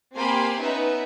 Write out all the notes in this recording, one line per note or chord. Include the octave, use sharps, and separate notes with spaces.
A#3 C4 G4 G#5 B5 C6
B3 C#4 D#4 B4 E5